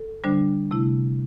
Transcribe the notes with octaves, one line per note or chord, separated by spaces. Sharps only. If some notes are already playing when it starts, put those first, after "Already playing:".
Already playing: A4
D3 G3 D4 C5
C3 A3 E4